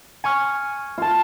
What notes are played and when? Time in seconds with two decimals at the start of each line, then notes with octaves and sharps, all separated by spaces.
0.24 G#5 C#6 F6
0.98 F4 A5